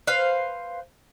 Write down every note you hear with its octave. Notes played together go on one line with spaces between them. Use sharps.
B4 C5 F5